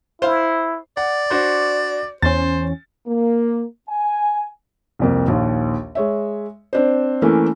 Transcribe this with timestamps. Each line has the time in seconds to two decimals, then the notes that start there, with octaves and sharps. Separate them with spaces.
0.22 E4 C5 F5
0.97 D5 F#5
1.30 D4 F#4 C5
2.22 E2 C#4 C5 A6
3.07 A#3
3.89 G#5
4.99 C2 F2 A#3
5.27 A#1 D#2
5.95 G#3 C#5 E5
6.73 C4 D4 C5
7.22 E3 A3 A#3 C#4 A#4